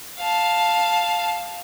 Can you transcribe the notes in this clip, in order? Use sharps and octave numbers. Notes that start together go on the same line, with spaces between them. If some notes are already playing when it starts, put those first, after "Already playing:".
F5 A5